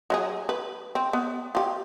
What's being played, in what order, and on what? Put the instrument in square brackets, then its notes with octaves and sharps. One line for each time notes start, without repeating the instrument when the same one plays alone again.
[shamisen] F#3 F4 G#4
B4
C4
B3
F4 G4